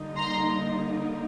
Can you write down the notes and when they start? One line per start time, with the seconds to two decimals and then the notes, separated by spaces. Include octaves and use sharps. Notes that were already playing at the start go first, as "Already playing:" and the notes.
Already playing: D3 G3 A#3 D#4
0.17 A#5 C6